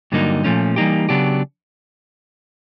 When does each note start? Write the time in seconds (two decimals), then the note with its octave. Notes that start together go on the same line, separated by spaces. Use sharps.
0.12 G2 D3 F#3 A#3 D#4
0.44 A#2 F3 A3 C#4
0.76 E3 G3 A#3 D#4 G4
1.09 C#3 F#3 B3 D4 G4